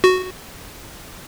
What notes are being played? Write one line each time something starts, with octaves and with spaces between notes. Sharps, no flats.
F#4